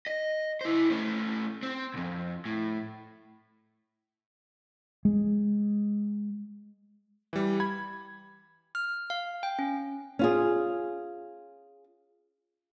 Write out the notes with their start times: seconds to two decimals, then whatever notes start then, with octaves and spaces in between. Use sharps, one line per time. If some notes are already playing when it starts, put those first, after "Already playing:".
0.07 D#5
0.61 E4 C5
0.90 A3 C#4
1.63 C4
1.94 C2 F2
2.45 A2
5.05 G#3
7.33 E3 G3
7.60 B5 G#6
8.75 F6
9.10 F5
9.43 G5
9.59 C#4
10.19 C#4 F4 G#4